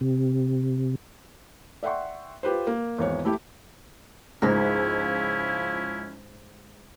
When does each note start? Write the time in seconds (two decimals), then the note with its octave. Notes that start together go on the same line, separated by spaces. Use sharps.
0.01 C3
1.83 D5 E5 F#5 G5 C6 C#6
2.43 F4 G4 B4 C5
2.67 A#3
2.98 G#1 E2 C#5
3.25 A3 E4 G4
4.42 C#2 G#2 F3 C#4 E4 A#4